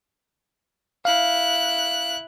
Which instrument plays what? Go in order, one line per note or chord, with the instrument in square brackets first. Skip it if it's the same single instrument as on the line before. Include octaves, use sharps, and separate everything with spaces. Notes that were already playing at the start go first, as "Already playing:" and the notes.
[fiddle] E4 F#6 [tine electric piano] F5